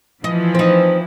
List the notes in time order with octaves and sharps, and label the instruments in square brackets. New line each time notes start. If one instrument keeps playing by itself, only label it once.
[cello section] E3 F3 [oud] D#5
[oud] C4 D#4